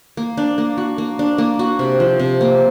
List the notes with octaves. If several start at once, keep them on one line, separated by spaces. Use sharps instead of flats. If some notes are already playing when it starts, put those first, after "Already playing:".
A#3
D4
A#3
F#4
A#3
D4
A#3
F#4
C3
F3
C3
A#3